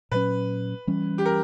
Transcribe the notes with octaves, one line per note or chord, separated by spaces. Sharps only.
A#2 F#3 C#4 B4
E3 G3 C#4
G4
A#4